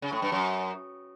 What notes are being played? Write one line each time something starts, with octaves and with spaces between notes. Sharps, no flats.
C#3
A2
G2
F#2